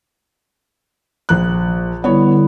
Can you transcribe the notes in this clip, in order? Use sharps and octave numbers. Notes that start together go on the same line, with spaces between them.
A#1 F#6
D3 G3 B3 E4 C#5